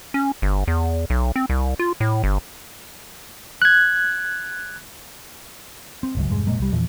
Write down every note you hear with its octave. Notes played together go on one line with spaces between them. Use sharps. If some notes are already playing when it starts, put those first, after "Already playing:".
C#4
G1
E2
B1
C4
C2
F4
A2
G1
F#6 G#6
C4
G1 C#2 F#2
E1 G2 G#3
F1 A#2 G#3 A#3
C2 G3
E2 A#2 E3 F3